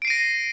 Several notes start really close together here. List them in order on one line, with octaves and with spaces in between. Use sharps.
D7 C7 D#7 A#6